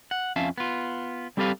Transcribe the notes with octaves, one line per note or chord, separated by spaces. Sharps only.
F#5
F2 C#4 E5 F5 A5
B3 F4
G3 C4 G4 A4 B4 F5